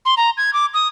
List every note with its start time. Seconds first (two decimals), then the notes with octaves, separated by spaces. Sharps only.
0.05 C6
0.17 A#5
0.37 G#6
0.53 D6
0.74 D#6